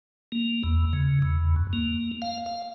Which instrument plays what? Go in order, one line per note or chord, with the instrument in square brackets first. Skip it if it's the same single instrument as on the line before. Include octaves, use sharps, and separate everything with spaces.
[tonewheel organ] A#3
E2
C#3
E2
F#2
A#3
F5
F5